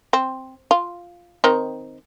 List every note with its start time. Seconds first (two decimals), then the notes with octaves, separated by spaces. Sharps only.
0.13 C4
0.71 F4
1.44 D#3 C4 D#4